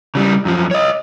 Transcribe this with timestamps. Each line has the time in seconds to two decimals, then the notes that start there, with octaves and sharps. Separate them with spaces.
0.15 C#3 G3
0.45 F#2 F3
0.71 C#5 D#5